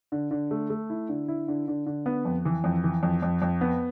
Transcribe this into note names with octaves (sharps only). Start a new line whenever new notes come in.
D3
D3
A3
A3
E4
D3
E4
D3
D3
D3
B3
F2
E3
F2
E3
F2
F2
F2
B3